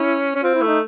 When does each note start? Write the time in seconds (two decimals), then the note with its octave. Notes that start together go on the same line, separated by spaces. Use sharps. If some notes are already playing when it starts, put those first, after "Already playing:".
Already playing: C#4 E4
0.35 C#4
0.42 C4 F4
0.54 E4
0.62 A3
0.67 D#4